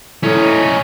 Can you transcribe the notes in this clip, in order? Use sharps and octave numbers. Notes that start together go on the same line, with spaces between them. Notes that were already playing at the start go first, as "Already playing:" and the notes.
A2 C#4 D#4